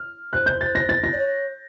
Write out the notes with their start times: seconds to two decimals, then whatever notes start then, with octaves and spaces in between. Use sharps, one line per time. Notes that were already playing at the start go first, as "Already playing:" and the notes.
Already playing: F6
0.33 C5 F#6
0.46 G6
0.61 A6
0.75 A#6
0.89 A6
1.04 A#6
1.13 D5
1.17 C#5